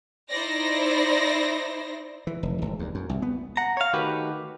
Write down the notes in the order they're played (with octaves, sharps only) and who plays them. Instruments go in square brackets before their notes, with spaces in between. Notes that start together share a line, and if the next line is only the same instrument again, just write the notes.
[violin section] D#4 E4 C5 D5 A#6
[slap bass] E3
F1
G#1
D#2
F#2
C2
B3
[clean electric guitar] F#5 A#5
C#5 F5
D#3 A3 F#4 G4 B4